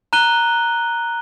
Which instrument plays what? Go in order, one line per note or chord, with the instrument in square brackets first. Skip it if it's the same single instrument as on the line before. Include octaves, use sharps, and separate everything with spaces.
[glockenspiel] A#5 F#6 D#7 G7